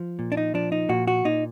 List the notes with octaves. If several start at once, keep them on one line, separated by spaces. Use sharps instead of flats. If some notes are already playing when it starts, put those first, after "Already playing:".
Already playing: F3
A#2
D4
D#4
F3 D4
D#4
A#2 F#4
F#4
A#2 D#4